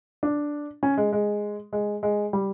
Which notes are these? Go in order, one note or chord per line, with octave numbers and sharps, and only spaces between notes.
D4
C#4
G#3
G#3
G#3
G#3
G3